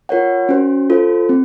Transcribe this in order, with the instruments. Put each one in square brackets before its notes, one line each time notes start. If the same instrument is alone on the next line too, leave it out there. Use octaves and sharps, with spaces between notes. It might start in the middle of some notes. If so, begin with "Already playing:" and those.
[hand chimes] F4 A#4 C#5 F#5
C#4 F#4 C5
F4 A4 C5
C4